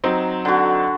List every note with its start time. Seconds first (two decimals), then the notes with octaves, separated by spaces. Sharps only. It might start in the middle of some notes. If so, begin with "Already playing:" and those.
0.04 F#3 C4 D#4
0.45 D3 F#4